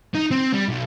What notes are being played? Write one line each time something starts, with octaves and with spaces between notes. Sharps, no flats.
D#4
C4
G3
B1